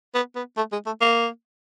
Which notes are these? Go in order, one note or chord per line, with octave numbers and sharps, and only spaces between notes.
B3
B3
A3
G#3
A3
A#3